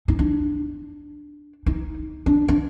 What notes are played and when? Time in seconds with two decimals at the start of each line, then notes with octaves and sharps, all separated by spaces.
0.08 D#4
0.19 D4
1.66 D#4
2.26 D4
2.48 D4